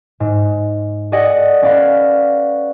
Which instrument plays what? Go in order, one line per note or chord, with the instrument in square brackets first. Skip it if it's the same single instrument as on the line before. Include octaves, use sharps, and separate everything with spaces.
[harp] G#2
F#4 G#4 A4 D5 D#5 F#5
C#4 B4 D5 F5 B5